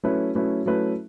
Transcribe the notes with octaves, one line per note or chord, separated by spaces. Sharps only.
F#3 A3 C#4 E4 B4
F#3 A3 C#4 E4 B4
F#3 A3 C#4 E4 B4